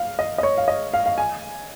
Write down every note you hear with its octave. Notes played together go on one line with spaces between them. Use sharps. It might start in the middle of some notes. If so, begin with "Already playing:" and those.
Already playing: F5
D#5
D#5
C#5
F5
D#5
F5
F5
G#5